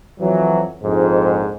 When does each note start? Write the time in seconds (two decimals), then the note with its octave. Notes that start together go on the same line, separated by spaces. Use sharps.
0.20 F2 E3 F#3
0.83 A#1 F2 G#2